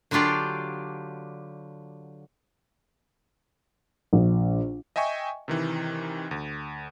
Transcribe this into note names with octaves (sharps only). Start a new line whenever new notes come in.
D3 F#3 D4 F4 G4 D5
A#1
D#5 E5 G5 G#5 C#6
C3 D#3 E3
D2